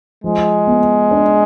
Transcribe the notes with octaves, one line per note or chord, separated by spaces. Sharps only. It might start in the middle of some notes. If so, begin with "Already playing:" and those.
F3 G#3
B3
D4